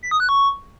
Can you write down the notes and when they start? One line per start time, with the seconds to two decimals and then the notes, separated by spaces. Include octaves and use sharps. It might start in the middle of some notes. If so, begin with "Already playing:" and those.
0.03 B6
0.11 D#6
0.20 F#6
0.29 C#6